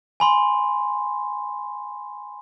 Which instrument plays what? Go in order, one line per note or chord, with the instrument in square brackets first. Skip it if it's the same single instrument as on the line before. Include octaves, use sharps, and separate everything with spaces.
[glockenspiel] G#5 B5 C6